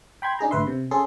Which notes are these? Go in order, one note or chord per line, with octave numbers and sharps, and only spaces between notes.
G5 B5 C6 G#6
D4 D#4 G#4 A#5
G#1 D2 D3 B4 E5 C6
C3
C#4 G#4 A4 C6